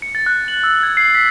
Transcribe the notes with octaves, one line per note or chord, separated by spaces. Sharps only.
C#7
A6
F#6
F#7
E6
G#6
C7
B6